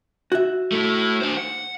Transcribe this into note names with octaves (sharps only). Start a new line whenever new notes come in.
F#4 E5
A3 E4
D4 C5
F#5